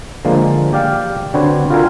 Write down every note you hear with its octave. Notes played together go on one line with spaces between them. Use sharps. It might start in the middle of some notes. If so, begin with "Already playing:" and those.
D3 F3 G#3 A#3
G4 D5 F5 G5
D3 C4 D4 F#4 B4 C#5
F4 F#4 A4 A#4 G5 G#5